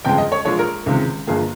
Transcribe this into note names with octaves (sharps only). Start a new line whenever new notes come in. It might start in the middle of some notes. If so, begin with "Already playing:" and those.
G1 F2 C#3 G#3 G5
D#5
C#5
A#1 A#2 G#3 C#5
A#4
C#2 C3 D#3 G#3
G1 G2 F3 A#3 G#4